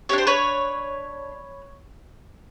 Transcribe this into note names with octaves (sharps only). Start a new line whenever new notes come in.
D4 G4 C#5
C5
B4 C#5